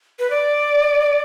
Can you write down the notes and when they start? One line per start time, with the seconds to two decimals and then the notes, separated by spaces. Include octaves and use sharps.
0.19 B4
0.30 D5